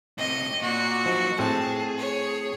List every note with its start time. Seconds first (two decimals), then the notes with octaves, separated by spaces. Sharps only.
0.18 A2 C3 D#5
0.62 A#2 F#4
1.06 F3 F#3 D#4
1.39 A2 C4 G#4 A5
1.98 C#5